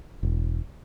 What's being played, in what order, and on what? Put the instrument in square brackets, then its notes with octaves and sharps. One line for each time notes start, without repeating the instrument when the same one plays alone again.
[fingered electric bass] E1